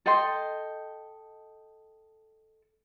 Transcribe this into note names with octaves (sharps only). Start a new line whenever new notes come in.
A4 D#5 G5 C6